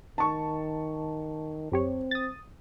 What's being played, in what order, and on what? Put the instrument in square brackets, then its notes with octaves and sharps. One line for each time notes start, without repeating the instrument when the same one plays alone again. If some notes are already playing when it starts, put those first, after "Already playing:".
[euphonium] D#3 [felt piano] A5 C#6
[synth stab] F#2 G4 C#5 [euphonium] C4
[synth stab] D#6 A6